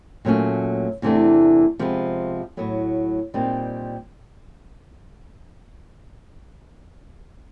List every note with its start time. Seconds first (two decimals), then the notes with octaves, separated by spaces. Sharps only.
0.25 A#2 F#3 A3 C#4
1.02 E2 C3 E3 A3 D4
1.79 C3 F3 G#3 B3
2.57 A2 F#3 B3
3.34 A#2 G3 C4 D#4